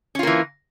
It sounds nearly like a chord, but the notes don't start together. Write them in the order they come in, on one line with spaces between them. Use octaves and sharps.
C#4 F4 A#3 E3